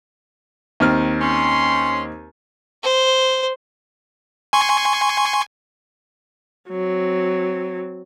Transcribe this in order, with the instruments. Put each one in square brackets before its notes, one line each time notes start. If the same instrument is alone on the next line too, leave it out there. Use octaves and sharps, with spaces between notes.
[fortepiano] D#2 C4 F6
[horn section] C#4 C6
[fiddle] C5
[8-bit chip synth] G#5 C6 C#6
[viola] F#3 C4